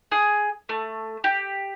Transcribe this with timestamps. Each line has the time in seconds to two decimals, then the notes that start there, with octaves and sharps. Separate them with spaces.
0.12 G#4
0.69 A3
1.24 G4